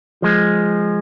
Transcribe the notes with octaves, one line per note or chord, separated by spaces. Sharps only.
F3 G#3